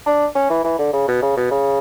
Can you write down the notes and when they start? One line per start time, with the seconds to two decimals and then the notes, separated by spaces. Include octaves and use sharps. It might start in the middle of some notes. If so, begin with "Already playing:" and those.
0.06 D4
0.35 C#4
0.50 E3
0.64 E3
0.79 D3
0.93 C#3
1.08 B2
1.23 C#3
1.37 B2
1.51 C#3